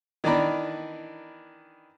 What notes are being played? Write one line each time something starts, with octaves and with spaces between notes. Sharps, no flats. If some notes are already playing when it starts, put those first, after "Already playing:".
D#3 E3 D4 D5 A#5 B5